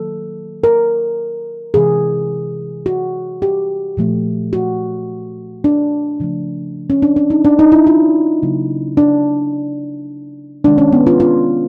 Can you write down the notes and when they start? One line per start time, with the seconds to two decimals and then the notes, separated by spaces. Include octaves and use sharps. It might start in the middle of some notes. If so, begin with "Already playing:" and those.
Already playing: D#3 F#3 A#3 A4
0.64 A#4
1.74 C3 E3 G#3 G#4
2.86 F#4
3.42 G4
3.97 A#2 F3 A3
4.53 F#4
5.64 D4
6.20 C#3 F3 A3
6.90 C#4
7.02 D4
7.16 D4
7.30 D#4
7.45 D4
7.59 D#4
7.72 E4
7.87 F4
8.42 C#3 F#3 A#3
8.97 D4
10.64 C3 D#3 G#3 D4
10.78 C#4
10.92 B3
11.07 F4
11.20 F4